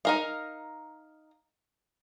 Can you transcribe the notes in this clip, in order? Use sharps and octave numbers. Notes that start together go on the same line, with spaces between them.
D#4 A#4 F5